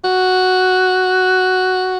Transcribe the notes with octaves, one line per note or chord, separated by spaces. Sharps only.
F#4